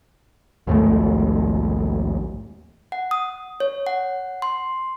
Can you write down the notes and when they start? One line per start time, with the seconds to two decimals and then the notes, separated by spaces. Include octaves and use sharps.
0.67 A#1 D#2 G#2 A3
2.92 F#5
3.11 D#6
3.60 C#5
3.86 F#5
4.42 C6